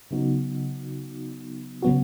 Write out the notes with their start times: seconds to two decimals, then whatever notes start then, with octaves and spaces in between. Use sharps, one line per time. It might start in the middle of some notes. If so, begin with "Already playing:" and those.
0.11 C#3 F#3 B3 D#4 F#4
1.82 C#3 F#3 B3 F#4